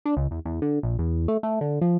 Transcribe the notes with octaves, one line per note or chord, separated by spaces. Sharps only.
D4
C#2
E2
E2
D3
A#1
E2
A3
A3
D3
F3